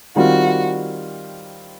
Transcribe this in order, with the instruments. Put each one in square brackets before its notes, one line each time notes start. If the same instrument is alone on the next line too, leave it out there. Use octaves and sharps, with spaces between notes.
[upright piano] D#3 G3 C4 F4 [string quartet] F#4